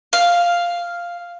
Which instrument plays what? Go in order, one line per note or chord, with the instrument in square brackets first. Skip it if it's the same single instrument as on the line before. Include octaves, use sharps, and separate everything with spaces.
[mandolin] F5